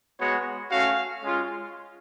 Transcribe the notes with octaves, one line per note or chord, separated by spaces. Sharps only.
G#3 B3 F#4 C#5
A3 C#4 F#4 F5
G#3 C#4 F4